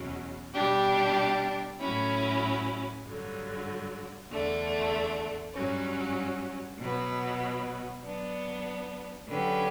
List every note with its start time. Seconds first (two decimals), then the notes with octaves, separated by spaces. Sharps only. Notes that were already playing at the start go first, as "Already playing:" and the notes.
Already playing: E2 B2 F#3 C#4
0.54 B2 G3 D4 G4
1.80 A2 F#3 C#4 E4
3.03 G2 D3 F#3
4.29 E2 D3 A3 D4
5.53 G2 F#3 C#4
6.79 B2 F#3 B3
8.02 F#3 B3 D4
9.28 D3 F#3 C#4 G4 B4